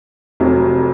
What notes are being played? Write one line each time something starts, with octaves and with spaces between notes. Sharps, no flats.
F1 F2 C3 F#3